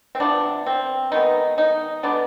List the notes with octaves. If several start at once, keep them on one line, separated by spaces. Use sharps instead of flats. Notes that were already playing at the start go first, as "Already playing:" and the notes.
C4
C3 F3 B3 D4
C4
D#3 G#3 B3 D#4
D#4
D3 G#3 B3 D4